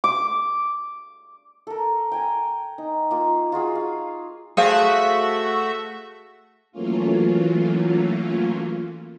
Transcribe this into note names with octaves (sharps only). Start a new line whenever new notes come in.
D6
A4 A#4
G5 G#5 A#5
D#4
A#3 F4
F4 F#4 G#4 C#6
F5
A3 F#4 G#4 C5 E5 F5
E3 F#3 A3 A#3 C#4 F4